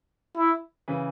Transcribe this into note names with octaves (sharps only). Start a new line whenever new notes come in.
E4
C#3 E3